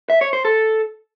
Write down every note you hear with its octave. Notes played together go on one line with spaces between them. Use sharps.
E5
C#5
C5
A4